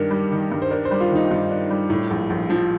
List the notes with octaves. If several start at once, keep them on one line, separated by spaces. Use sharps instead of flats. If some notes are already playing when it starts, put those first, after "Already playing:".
Already playing: G2 D#3 D4 A#4
G3
D#3
G2
C5
D4 A#4
C5
G3
F4
D#3
D#4
G2 F4
D4
G3
A2
A#1
A#1
F3